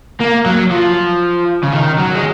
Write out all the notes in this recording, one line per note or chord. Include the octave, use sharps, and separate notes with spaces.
A#3
F#3
F3
C#3
D#3
F#3
G#3